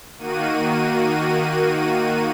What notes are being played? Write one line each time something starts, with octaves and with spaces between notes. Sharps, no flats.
D#3 A#3 F#4 D#7